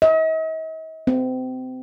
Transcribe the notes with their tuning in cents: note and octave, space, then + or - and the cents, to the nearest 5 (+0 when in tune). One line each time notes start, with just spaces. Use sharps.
D#5 +45
C4 -30